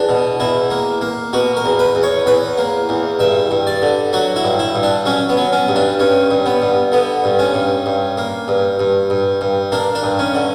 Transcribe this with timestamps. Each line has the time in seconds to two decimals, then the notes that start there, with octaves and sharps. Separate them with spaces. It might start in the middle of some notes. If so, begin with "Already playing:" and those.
Already playing: E2 D4
0.09 B2
0.40 E2 E4
0.70 A#3
1.01 A#3
1.33 B2 F#4
1.57 A#4
1.65 E2
1.79 B4
1.95 E2
2.03 C#5
2.26 E2 B4
2.58 A#3
2.89 E2
3.19 G2 E5
3.51 G2
3.67 D5
3.82 D3
4.13 F#3 F#4
4.36 E4
4.44 G2
4.59 E4
4.75 G2
4.83 D4
5.05 F#3 C#4
5.29 B3
5.37 F#3
5.53 C#4
5.68 G2
5.76 D4
5.99 G2 C#4
6.31 G2
6.46 B3
6.62 G2
6.92 D3 B3
7.24 G2
7.39 C#4
7.54 G2
7.86 G2
8.18 A#3
8.48 G2
8.79 G2
9.10 G2
9.41 G2
9.72 A#3 D4
9.95 D4
10.03 G2
10.19 C#4
10.35 D3